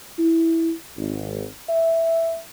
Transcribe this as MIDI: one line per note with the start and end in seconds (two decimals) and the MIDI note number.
0.18 0.72 64
0.97 1.47 32
1.69 2.40 76